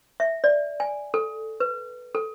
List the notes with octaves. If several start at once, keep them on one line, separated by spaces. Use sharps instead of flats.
E5
D5
G#5
A4
B4
A4